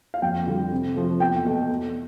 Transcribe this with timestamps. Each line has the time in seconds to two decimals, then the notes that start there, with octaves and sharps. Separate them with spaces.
0.14 F5
0.22 F2 G5
0.47 D3 G3
0.72 C3
0.96 F3 A3
1.20 E2 G5
1.45 B2 A3
1.70 E2